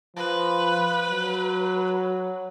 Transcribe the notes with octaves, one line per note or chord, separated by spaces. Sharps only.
F3 B4
F#3